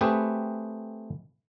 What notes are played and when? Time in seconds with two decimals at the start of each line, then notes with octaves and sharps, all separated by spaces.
0.01 A3 C4 G4 G#4 B4